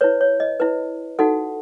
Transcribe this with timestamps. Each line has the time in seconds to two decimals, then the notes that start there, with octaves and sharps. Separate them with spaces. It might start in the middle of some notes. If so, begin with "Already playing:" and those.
0.01 E4 B4 C#5
0.21 C#5
0.40 D#5
0.60 E4 B4
1.19 D#4 F#4 A4 F#5